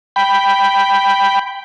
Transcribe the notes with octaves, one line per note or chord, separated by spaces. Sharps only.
G5 B5